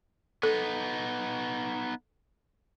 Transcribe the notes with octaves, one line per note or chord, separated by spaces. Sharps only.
B3 D#4 A4